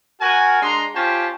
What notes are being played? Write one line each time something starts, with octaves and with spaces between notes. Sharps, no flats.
F#4 A#4 G#5
G#3 D4 A#5 C6
C#4 F4 G4 C5 G5 A5